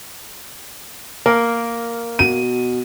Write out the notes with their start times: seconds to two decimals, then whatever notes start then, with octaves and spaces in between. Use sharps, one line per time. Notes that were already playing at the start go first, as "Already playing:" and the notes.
1.26 A#3 A#4
2.19 B2 D#7